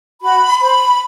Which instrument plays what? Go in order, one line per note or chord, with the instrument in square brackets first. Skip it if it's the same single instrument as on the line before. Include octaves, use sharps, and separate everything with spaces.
[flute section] F#4 B5
C5 B5